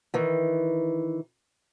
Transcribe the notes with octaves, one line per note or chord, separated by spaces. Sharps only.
D#3 E3